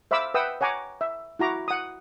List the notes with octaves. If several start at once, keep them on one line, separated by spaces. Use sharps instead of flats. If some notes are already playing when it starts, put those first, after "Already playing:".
C5 E5 F5 B5 D6 E6
B4 E5 F#5 G5 D#6 E6
C#5 F#5 G#5 A#5 D6
E5
E4 F#4 A#5 D6
F#5 D#6